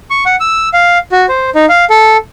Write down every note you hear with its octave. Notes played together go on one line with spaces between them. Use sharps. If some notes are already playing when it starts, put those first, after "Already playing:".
C#6
F#5
E6
F5
F#4
C5
D#4
F5
A4